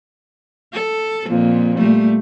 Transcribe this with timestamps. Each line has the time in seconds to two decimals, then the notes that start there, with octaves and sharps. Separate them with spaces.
0.73 A4
1.29 F2 A#2
1.77 A#2 G3 A3